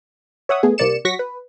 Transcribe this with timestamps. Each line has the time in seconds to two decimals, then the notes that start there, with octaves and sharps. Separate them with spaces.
0.49 C#5 E5 F#5 D#6
0.63 A3 B3 G#4
0.78 C2 C3 A#3 D5 C#7 E7
1.05 F#3 F#4 C#6 A#6 B6
1.19 B4